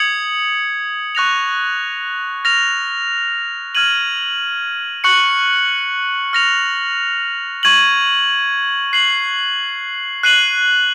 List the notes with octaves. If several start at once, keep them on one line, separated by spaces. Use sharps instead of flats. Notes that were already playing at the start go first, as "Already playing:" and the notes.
Already playing: D#6 G#6 C#7 F#7
C#6 F#6 A#6 F7
F6 A#6 F7
F6 G#6 D#7 F#7
C#6 F#6 C#7 F#7
F6 A#6 F7
C#6 G#6 D#7 F#7
F#6 C7 F#7
F#6 C7 D#7 F#7